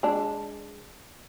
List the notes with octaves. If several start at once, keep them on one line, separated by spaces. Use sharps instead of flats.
G#3 D4